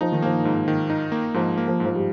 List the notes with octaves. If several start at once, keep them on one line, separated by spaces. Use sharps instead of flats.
F3 D#4
D#3
F3 A#3
G#2
D#3
D#4
A#3
G#2 F3
A#3
F3
G#2
F3
G3